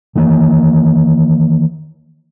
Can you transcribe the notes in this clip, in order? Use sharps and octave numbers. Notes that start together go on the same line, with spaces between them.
D#3 E3 A#3